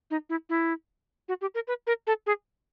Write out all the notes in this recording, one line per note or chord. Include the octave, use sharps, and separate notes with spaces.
D#4
E4
E4
F#4
G4
A#4
B4
A#4
A4
G#4